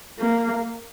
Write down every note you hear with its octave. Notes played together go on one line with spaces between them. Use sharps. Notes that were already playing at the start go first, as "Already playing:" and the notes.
A#3